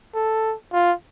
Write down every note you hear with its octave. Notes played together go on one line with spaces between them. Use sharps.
A4
F4